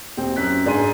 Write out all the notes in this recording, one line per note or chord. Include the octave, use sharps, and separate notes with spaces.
D#1 C4
F#2 F#6 B6
G#2 D4 G#5 C6 D#7